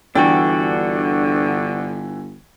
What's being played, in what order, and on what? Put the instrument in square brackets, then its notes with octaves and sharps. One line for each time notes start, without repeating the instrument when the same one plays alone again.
[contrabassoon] G1 [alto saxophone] D3 [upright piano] E3 G5 A6 [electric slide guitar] D4 F#4